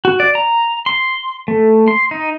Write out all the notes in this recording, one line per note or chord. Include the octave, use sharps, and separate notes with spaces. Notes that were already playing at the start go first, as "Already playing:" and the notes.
F#4
D5
A#5
C6
A3
C6
D#4